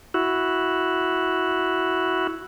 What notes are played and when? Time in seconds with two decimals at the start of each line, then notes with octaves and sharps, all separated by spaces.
0.14 E4 F#4